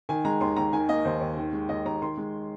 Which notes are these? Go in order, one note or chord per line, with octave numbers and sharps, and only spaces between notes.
D#3 G#5
G#3 A#5
D#2 C6
D#2 A#5
D#3 G#5
A#3 D#5
D#2 C5
D#2
D#3
G#3
D#2 D#5
D#2 A#5
D#3 C6
G#3